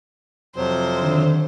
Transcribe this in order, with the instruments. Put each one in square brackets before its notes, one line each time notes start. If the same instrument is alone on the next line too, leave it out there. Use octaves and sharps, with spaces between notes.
[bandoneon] F2 C3 F#3 [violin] C5
[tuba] D3 [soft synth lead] D#3